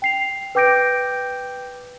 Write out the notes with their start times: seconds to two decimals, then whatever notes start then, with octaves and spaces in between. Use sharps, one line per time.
0.02 G5 C7 F7
0.55 B4 G5 D6 G6 A#6 D7